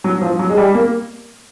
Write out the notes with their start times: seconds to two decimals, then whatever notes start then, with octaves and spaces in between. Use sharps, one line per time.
0.04 F#3
0.22 F3
0.39 F#3
0.49 G#3
0.57 G3
0.74 A#3